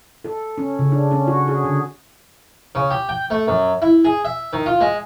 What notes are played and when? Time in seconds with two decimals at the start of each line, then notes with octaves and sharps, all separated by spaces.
0.24 A4
0.58 C#4
0.79 C#3
0.92 D4
1.11 C#4
1.27 F#4
1.48 G#4
1.64 D3
2.75 C#3
2.90 G4
3.09 G5
3.30 A3
3.48 F#2
3.82 E4
4.05 G#4
4.25 E5
4.53 D#3
4.66 F4
4.81 G#3